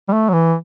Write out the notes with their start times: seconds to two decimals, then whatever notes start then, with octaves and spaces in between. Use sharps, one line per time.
0.08 G3
0.12 A3
0.29 F#3
0.33 E3